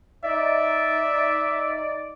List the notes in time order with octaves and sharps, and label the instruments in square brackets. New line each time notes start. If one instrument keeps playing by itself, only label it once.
[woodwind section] D#4 D5 [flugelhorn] E5